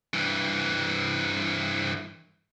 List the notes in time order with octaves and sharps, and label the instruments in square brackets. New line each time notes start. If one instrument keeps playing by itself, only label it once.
[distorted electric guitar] G2 E3